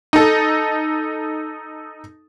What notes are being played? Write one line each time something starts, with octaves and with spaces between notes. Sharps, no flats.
D#4 A4